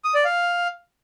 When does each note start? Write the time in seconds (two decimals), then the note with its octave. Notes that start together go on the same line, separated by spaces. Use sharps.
0.04 D#6
0.15 D5
0.25 F5